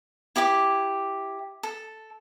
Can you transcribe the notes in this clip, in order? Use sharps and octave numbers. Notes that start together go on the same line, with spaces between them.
E4 G4 E5 D6
A4